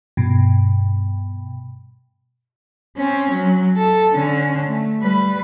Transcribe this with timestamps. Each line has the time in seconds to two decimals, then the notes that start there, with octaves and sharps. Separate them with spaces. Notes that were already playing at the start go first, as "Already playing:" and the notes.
0.17 G2 B2
2.97 C4 C#4
3.31 F#3
3.77 A4
4.14 D3 C#4
4.68 A3
5.01 G3 B4